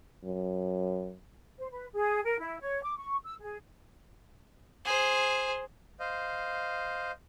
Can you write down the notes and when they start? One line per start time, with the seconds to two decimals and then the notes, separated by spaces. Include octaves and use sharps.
0.24 F#2
1.59 C5
1.71 B4
1.93 G#4
2.25 A#4
2.40 E4
2.60 C#5
2.83 D6
2.97 C#6
3.25 E6
3.41 G#4
4.85 G#4 C5
6.00 C5 D#5 F5